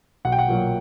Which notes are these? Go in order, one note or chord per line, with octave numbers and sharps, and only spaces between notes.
B1 F#5
G5
F#5
A#2 F#3 A#3